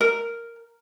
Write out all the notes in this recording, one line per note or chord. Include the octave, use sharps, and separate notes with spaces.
A#4